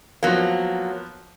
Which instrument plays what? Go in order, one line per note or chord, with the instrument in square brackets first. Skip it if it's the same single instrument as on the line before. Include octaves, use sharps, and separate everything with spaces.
[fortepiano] F3 B3 [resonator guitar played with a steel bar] F#3 A#3